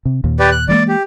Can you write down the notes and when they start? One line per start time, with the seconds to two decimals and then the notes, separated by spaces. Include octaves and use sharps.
0.05 C3
0.24 D#2 A#2
0.39 G4 B4 D5
0.51 F#6
0.68 E3 G#3 A#3 D5
0.88 G4